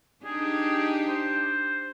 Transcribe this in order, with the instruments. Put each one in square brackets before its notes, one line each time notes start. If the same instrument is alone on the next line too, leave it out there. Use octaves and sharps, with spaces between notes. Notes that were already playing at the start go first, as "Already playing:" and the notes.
[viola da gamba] D4 D#4 G4 [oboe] G#4
[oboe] C5